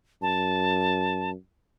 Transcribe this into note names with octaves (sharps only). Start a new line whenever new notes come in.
F#2 A5